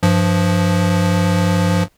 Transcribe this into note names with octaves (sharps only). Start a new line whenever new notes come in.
G2 F3